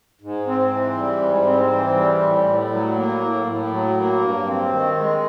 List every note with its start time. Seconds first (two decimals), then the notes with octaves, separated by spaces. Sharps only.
0.22 G#2
0.47 C4
0.71 E3
0.97 G3
1.22 G#2
1.46 C4
1.71 E3
1.96 G3
2.21 A2
2.47 A2
2.71 F#3
2.96 A#3
3.21 A2
3.47 A2
3.71 F#3
3.97 A#3
4.21 G2
4.47 C4
4.72 D#3
4.97 G#3